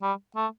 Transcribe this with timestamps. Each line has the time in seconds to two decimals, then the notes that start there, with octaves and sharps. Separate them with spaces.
0.02 G3
0.36 A3